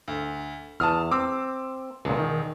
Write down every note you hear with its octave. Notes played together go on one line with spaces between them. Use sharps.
D2
E2 A5 D#6 F6
C4 D6 E6
E1 C#2 A#2
D#3